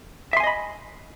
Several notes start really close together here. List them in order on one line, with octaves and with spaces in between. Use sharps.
E5 C6 G#5 D#5 B5